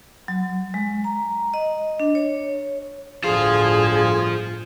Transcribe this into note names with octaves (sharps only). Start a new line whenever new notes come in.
F#3
G#3
A#5
D#5
D4
C#5
G1 D2 A2 D3 F4 G#4 C5 F5